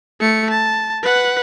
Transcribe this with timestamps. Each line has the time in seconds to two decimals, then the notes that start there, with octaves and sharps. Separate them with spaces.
0.20 A3 C#7
0.50 A5
1.02 B4 F#5